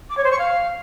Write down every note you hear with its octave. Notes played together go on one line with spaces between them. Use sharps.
D6
C#5
C5
C#6
F5